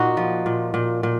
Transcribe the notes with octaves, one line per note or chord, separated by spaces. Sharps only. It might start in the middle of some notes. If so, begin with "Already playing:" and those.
Already playing: A#2 D#4 F#4
F3
A#2
A#2
A#2